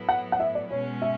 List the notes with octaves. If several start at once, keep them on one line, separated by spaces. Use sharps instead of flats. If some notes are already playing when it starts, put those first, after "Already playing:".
Already playing: A2 F#3 B3 E4
F#5
F#5
E5
D5
B2 G#3 C#4 C#5
E5